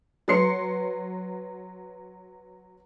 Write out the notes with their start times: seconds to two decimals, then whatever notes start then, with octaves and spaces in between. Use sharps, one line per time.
0.28 F#3 B4 C6 C7 C#7